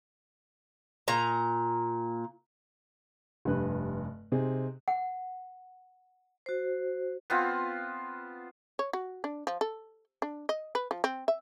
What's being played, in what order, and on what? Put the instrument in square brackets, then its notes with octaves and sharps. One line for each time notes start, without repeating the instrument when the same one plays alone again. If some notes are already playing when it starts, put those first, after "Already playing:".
[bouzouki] A#2 A#5
[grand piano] F1 G2 B4 F#6
C3 C4 D#4 G#4
[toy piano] F#5
[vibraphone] F#4 C5
[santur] B3 C4 F4
[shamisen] C#5
F#4
D4
F3
A4
D4
D#5
B4
F3
C4
E5